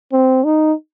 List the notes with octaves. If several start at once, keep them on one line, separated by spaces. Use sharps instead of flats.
C4
D#4